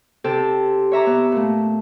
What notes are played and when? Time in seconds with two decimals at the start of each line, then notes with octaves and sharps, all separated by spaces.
0.24 C3 G4 A4
0.92 C#5 E5 A#5 D6
1.07 B3
1.32 A#2 A3